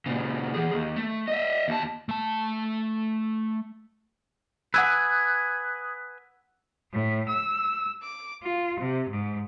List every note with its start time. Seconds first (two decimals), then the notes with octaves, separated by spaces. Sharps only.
0.06 A#2 C#3
0.54 E3 G#4
0.73 D#2
0.96 A3
1.28 D#5 E5
1.68 D#2 A5
2.09 A3 A5
4.74 B4 F#5 G#5 D#6 E6 F#6 G#6
6.92 A2
7.28 E6
8.01 D6
8.44 F4
8.80 C3
9.09 G#2